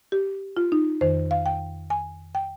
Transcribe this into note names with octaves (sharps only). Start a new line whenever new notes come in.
G4
F4
D#4
F2 D#3 C5
F5
G5
G#5
G5